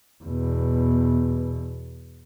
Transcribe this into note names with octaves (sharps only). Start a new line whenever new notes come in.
E2 B2